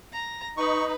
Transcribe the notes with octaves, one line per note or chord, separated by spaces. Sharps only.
A#5
D#4 B4 C#6